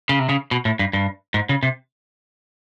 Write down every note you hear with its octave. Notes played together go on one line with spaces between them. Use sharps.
C#3
C3
C#3
B2
A2
G2
G2
G#2
C#3
C3